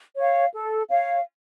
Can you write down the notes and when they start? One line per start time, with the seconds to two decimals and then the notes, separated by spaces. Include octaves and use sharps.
0.16 C#5 F5
0.53 A4
0.89 C#5 F5